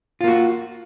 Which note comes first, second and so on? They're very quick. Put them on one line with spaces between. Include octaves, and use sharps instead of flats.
F4 A#3 F#4